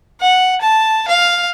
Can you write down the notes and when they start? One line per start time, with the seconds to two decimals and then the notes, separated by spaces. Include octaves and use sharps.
0.21 F#5
0.61 A5
1.08 F5